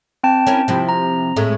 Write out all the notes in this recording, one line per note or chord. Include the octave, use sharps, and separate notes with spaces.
C4 G5 A5
C#4 E4 A#4
C3 F3 E4
A#5
A2 G#3 A3